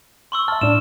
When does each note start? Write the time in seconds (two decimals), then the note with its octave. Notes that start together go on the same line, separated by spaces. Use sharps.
0.32 C6 C#6 E6
0.48 E5 A5 F6
0.61 A2 D4 E7